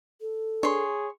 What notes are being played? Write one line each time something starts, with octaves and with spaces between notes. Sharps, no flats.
A4
D4 G#4 B4 C#5 C6